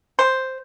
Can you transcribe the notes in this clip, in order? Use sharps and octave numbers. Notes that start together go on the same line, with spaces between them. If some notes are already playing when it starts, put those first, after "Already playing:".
C5